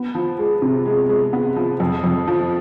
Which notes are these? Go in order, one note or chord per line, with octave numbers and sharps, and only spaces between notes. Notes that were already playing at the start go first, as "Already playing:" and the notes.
Already playing: B3
F3
G#3
C3
G#3
G#3
B3
F3
F2
F2
F3